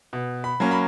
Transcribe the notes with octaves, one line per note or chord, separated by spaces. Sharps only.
B2
B5
F#3 A#3 C#4
B5